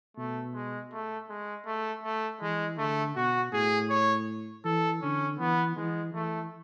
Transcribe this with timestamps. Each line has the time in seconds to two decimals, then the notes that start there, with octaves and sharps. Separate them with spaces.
0.17 B2 A3
0.54 G#3
0.92 A3
1.29 G#3
1.66 A3
2.03 A3
2.41 E3 G#3
2.78 D3 A3
3.16 B2 F#4
3.52 A2 G#4
3.89 C#5
4.64 E3 A4
5.02 D3 C#4
5.39 E3 B3
5.77 E3 G#3
6.13 E3 A3